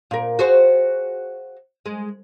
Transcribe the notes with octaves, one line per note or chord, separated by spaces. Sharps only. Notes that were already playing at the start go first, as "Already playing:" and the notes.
A#2 A#4
F#4 G#4 C5
G#3